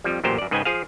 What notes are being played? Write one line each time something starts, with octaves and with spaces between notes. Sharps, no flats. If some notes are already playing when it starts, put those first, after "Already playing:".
F2 F3 G3
A1 F#2 A#2 G4 C5
F#2 D5
G#2 C#3 B4 D#5 G5 G#5
F3 G#4 F5